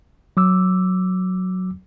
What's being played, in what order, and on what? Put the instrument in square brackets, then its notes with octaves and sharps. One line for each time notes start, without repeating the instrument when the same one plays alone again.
[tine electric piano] F#3 D6 E6